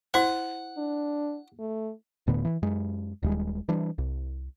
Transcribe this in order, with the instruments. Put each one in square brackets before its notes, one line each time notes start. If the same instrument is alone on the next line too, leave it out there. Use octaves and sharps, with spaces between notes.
[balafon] E4 C5 [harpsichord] F#5
[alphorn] D4
A3
[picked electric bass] D1 A2 D3 B3
E3
F#2 G#3
D#1 D#2 G3 G#3
E3 G3 D4
C2